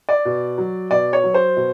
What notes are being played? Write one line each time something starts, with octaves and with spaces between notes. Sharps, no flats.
D5
B2
F#3
B2 D5
C#5
F#3
C5
B2